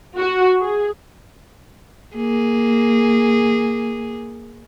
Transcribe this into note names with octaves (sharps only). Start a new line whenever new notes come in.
F#4
G#4
A#3 G#4